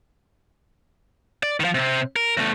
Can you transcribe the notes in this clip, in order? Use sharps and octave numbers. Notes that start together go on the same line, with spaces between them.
D5
D#3 F3
C3 C4
A#4
E2 A3